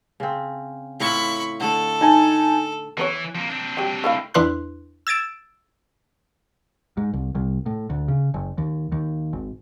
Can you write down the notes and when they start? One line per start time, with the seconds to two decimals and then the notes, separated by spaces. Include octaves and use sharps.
0.20 C#3 C4
1.00 A2 E4 F4 B5 C#6
1.60 D3 A3 A4
2.01 D#4 G#5 A5
2.97 E3 B3 B4 C#5
3.35 F2 A#3
3.50 C4 D4
3.77 F#3 G4
4.04 A3 E4 F5
4.34 E2 D4 E4 B4 C6 F#6
5.07 E6 G#6 A6 D7 E7
6.97 G#2
7.13 C2
7.35 C2
7.66 A2
7.90 D2
8.08 C#3
8.34 F#1
8.58 D#2
8.92 D#2
9.33 G#1